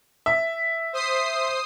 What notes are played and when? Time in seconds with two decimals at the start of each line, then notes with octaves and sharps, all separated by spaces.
0.26 E5
0.93 C5 D#6 C7